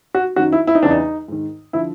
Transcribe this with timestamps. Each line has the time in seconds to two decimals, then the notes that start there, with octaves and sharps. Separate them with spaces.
0.15 F#4
0.36 F#2 D#3 F#4
0.52 E4
0.67 E4
0.75 D#4
0.83 E2 C#3 E3 D4
0.90 D#4
1.28 G#2 D#3
1.73 D3 F3 E4